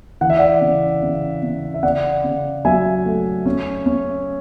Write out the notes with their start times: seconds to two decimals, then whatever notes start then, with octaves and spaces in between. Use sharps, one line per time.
0.21 E3 F#5
0.30 E5
0.38 D5 F#5
0.61 C#3
1.02 C#3
1.43 C#3
1.74 E5
1.83 C#3 D5 F#5
2.24 C#3
2.65 F#3 E5 G#5
3.05 A3
3.46 C#4
3.86 C#4